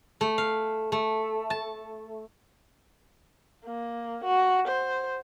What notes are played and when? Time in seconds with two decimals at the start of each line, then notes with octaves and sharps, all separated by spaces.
0.21 A3
0.38 F5
0.92 A3
1.50 A5
3.65 A#3
4.24 F#4
4.68 C5